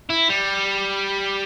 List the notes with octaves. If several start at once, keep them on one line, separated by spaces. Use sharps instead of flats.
E4
G3